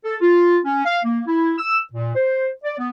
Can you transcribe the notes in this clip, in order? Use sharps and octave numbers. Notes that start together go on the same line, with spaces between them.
A4
F4
C#4
F5
A#3
E4
E6
A#2
C5
D5
B3